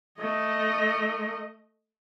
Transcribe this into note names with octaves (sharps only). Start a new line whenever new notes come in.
A3 D#5